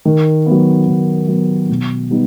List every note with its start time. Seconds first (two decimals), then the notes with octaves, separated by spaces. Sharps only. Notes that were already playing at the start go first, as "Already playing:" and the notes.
0.05 D#3
0.46 F#3 B3
0.87 D#3
1.28 F#3 B3
1.69 B2
2.10 G3 B3 D#4